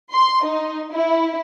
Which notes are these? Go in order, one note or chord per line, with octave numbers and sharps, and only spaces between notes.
C6
D#4
E4